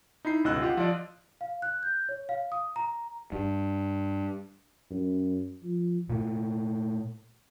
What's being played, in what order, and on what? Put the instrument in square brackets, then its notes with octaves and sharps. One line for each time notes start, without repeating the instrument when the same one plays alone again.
[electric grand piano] D#4 E4 B5 C7
G1 C#2 B2 D#5 E6 F#6
F4 G4 D#5 F#5
F3 F4 D5 D#5
[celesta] F5
F#6
G6
C#5
F5
D#6
A#5
[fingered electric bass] G2
[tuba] F#2
F3
[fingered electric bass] A#2 A3